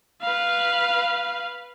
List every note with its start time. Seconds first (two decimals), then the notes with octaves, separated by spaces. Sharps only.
0.21 B4 F5